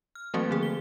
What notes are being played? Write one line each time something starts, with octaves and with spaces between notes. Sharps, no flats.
F6
E3 F#3 A3 A#3 C4 F#4
D3 F3 G#4
G7